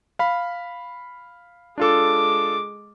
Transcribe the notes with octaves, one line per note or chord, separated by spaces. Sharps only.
F5 B5
G#3 D4 F4 A4 D6